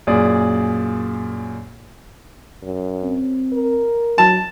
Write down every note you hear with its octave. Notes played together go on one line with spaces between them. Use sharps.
F#2 A#2 G#4 D5
F#2
C4
A#4
F#3 A5